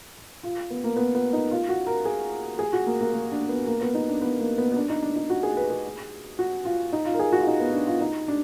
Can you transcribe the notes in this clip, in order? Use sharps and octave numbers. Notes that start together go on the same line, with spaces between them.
F4
B3
A#3
B3
B3
D#4
F4
F#4
A#4
G#4
G#4
F#4
A#3
A#3
A#3
D4
B3
A#3
B3
D#4
D4
B3
A#3
B3
B3
D4
D#4
D4
D#4
F#4
G#4
B4
G#4
F#4
F4
D#4
F4
A#4
G#4
F#4
F4
D#4
B3
D4
F4
D#4
D4